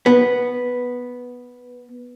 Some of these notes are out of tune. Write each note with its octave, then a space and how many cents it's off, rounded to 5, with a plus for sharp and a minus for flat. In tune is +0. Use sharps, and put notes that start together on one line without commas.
B3 -5